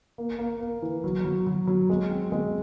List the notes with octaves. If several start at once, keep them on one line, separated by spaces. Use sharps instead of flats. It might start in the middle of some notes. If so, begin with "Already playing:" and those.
A#3
A#3
A#3
E3
F#3
F#3
F#3
F#3
G#3
C4
G#3